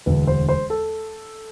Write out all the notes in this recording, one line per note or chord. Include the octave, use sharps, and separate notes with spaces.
E1 D2 D3 B4
C5
C5
A4